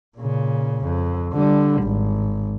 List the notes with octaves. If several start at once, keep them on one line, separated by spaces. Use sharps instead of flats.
A#2 C#3
F2
D3 G3
G#1